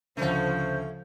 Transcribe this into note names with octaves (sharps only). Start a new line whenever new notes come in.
D2 C#3 F3 A3 C#4 C5